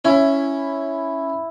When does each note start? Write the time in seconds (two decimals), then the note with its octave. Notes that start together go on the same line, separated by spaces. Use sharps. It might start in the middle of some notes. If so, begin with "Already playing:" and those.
0.05 C#4 E4